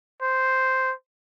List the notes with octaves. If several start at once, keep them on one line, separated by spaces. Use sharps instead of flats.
C5